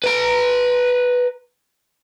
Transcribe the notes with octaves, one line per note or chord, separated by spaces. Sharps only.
B4 A#5